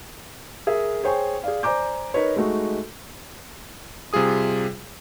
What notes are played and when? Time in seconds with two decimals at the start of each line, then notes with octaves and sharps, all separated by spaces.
0.67 G#4 A#4 E5
1.04 G#4 C5 C#5 G5 G#5 C#6
1.43 G#4 D5 F5
1.63 C5 D5 G#5 A#5 D6 G6
2.14 D#4 A#4 B4 C#5
2.36 G#3 A3 D#4 F#4
4.13 C3 G3 F4 G#4 D#6